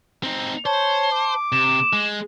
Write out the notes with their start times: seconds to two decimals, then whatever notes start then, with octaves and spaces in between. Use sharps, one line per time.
0.23 C4 D#4
0.66 C5 C#5 A5
1.12 D6
1.52 C3 E7
1.93 G#3